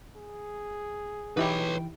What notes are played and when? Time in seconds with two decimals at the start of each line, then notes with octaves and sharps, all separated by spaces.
0.16 G#4
1.37 E3 D#4 E4 G4 B4 C#5 G5